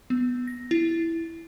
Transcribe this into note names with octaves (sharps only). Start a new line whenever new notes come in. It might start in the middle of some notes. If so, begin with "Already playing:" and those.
B3
A#6
E4